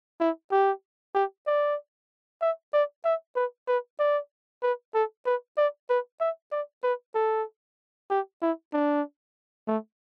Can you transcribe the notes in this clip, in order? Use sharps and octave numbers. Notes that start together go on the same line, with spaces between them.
E4
G4
G4
D5
E5
D5
E5
B4
B4
D5
B4
A4
B4
D5
B4
E5
D5
B4
A4
G4
E4
D4
A3